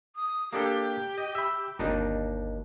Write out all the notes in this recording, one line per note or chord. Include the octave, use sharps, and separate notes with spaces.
D#6
A#3 D4 G4 A4
D#5
E5 B5 E6
G1 D#2 D4 D#4